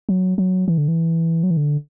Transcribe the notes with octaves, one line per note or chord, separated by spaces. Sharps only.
F#3
F#3
E3
D3
E3
F#3
E3
D3